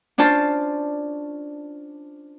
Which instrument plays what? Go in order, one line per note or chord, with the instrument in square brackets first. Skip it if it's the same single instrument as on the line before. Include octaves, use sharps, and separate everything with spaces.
[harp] C#4 D4 F4 C5 A5